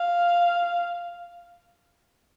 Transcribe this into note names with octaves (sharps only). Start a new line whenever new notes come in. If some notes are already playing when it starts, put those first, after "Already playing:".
Already playing: F5